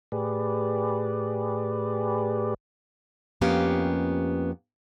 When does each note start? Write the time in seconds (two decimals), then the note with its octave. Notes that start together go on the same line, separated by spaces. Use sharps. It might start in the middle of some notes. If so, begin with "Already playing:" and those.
0.12 A2 G4 G#4 B4 D5
3.41 F2 A#3 B3 C#4 G4 F5